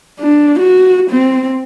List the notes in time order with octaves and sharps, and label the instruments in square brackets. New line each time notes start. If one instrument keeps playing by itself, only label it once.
[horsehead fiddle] D4
F#4
C4